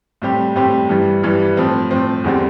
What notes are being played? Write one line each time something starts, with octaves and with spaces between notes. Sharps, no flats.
A2 G3 C4 G4
A2 G3 C4 G4
G2 E3 G3
G2 E3 G3
A2 F3 C4
A2 F3 C4
E2 D3 G3 C4